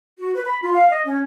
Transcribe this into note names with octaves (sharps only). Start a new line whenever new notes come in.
F#4
B4
B5
F4
F5
D#5
C#4